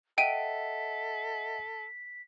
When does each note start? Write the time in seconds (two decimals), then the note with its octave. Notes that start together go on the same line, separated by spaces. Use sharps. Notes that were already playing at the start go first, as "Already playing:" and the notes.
0.18 A4 D#5 E5 F#5 G5 B6 D7 D#7